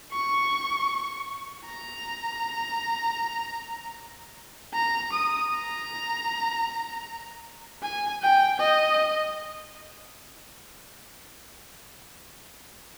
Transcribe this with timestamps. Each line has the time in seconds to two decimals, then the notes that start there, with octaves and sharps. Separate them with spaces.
0.12 C#6
1.67 A#5
4.74 A#5
5.13 D#6
5.52 A#5
7.83 G#5
8.22 G5
8.60 D#5